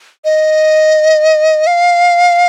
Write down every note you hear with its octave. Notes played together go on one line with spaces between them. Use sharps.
D#5
F5